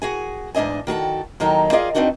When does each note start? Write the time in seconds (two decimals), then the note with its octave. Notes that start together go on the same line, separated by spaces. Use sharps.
0.02 F#4 G#4 G#5
0.54 E2 G#2 D4 D#5 G#5
0.87 D#3 F#4 G#4 A4
1.40 D#2 D#3 F#3 D#4 A4
1.72 F4 G#4 D5 D#5 F5
1.95 B3 C4 D4 D#4 F#4 A4